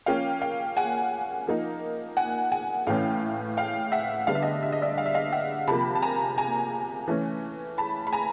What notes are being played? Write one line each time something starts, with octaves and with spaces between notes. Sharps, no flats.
F3 A#3 C#4 F5 G5
F5 G5
F#5 G#5
F3 A#3 D#4
F#5 G#5
F#5 G#5
A2 E3 A3 C#4 F5 G5
F5 G5
E5 F#5
D3 G3 B3 D4 F5
E5
D#5 F5
E5
D#5
D5 E5
F5
E5
D#5 F5
E5 F#5
C3 F3 A#3 A5 B5
A5
G#5 A#5
G#5 A#5
E3 A3 C#4
A5 B5
B5
G#5 A#5